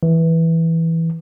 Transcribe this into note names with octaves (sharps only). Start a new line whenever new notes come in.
E3